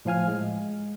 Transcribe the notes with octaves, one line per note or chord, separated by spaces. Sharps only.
A2 F3 F5 G#5 F6
G#3